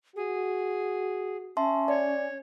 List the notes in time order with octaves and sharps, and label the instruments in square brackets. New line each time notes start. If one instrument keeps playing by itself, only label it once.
[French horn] F#4 [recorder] G#4
[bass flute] C#4 [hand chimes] E5 A5 C6
[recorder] C#5 [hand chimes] D5